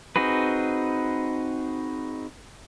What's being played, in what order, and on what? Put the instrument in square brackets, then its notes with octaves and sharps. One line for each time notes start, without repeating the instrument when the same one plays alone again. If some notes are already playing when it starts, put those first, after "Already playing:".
[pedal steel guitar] C4 D#4 F#4 G#4 B4